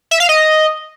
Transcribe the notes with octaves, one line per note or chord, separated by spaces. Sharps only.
E5
F5
D#5